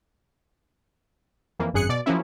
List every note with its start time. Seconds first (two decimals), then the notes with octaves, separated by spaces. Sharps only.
1.59 F2 E3 A#3
1.74 G#1 F#2 G#4 F#6 C#7
1.89 B2 D5
2.06 F3 F#3 A#3 C#4 E4